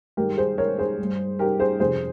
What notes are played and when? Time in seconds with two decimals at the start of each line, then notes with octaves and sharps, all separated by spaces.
0.17 G2 D#3 G#3 G4 A#4
0.38 G#4 C5
0.58 A#4 C#5
0.78 G#4 C5
0.99 G2 G3
1.39 G4 A#4
1.59 G#4 C5
1.80 F2 C3 G3 G#4 C5